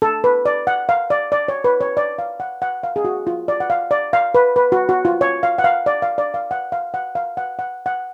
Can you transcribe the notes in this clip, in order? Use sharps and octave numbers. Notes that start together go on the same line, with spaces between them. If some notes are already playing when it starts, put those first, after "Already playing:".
A4
B4
D5
F#5
F5
D5
D5
C#5
B4
C#5
D5
F5
F#5
F#5
F5
G#4
F#4
F4
D5
F#5
F5
D5
F5
B4
B4
F#4
F#4
F4
C#5
F5
F#5
F5
D5
F5
D5
F5
F#5
F5
F#5
F5
F#5
F#5
F#5